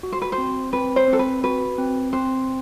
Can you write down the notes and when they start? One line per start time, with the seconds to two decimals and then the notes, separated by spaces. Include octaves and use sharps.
0.03 F#4
0.12 C5
0.22 B4
0.32 C5
0.38 C4
0.73 C4 B4
0.96 C5
1.08 C4 A4
1.19 B4
1.44 F#4 B4
1.78 C4
2.13 C4 C5